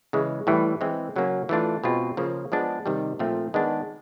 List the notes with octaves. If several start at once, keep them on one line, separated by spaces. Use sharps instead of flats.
C#3 E3 G#3
A2 E3 G3
E3 G#3 C4
C#3 F#3 A#3 C#4
E3 A3 D4 F4
B2 G#3 C4 F4
C#3 F3 A#3
F3 G#3 B3 D4
C3 D#3 G3
A#2 F3 A3 C4 F4
D#3 G#3 B3 D4